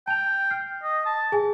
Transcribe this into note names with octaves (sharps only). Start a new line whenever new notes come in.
G5 A5 F7
F6 C7
D#5
A5
G#4 G#5